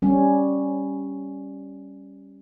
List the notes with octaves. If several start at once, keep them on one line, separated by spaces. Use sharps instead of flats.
G3 C#4